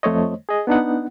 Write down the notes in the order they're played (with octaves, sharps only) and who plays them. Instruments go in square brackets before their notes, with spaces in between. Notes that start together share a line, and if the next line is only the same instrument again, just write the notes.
[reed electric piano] F2 A3 C5 C#5 D#5
G#4 D#5
B3 D4 D#4 F#5